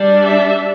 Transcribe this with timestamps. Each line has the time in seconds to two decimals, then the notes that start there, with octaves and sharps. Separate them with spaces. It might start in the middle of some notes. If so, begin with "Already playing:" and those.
Already playing: G3 D4
0.25 E5